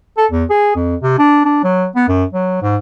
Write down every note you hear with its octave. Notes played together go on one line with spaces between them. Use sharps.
A4
E2
G#4
F2
C3
D4
D4
F#3
B3
F#2
F#3
G#2